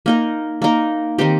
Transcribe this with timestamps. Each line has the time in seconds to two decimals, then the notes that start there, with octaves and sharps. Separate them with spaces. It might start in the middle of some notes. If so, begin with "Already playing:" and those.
0.06 A#3 D#4 A#4
0.62 A#3 D#4 A#4
1.18 D#3 C4 D#4 G4